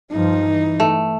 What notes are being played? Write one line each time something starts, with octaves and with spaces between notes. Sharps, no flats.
G2 F3 D#4
E3
A3